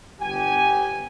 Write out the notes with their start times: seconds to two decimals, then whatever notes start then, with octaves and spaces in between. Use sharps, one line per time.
0.20 G1 B3 G4 G#5